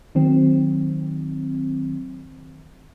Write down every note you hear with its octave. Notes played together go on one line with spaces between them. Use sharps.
D#3 F#3 C4